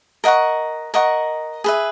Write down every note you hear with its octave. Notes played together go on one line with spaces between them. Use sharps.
A#4 D#5 F#5 C#6
A#4 D#5 F#5 C#6
G#4 B4 E5